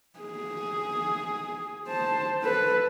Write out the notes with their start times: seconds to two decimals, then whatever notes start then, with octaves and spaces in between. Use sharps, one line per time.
0.20 G#4
1.88 C5 A5
2.42 A4 B4